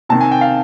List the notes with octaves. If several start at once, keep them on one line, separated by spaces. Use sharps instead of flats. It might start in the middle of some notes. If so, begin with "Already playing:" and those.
C3 D#3 A5
G#5
G5
F5